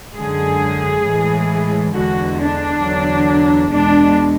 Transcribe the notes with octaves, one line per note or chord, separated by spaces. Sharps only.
F#2 D3 G#3 G#4
A2 E3 G#3
E2 D3 G#3 F#4
D4
E2 D3 F#3
E2 B2 G#3 D4